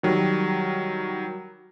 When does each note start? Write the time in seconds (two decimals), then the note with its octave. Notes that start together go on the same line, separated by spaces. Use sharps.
0.03 D#3 F#3 G3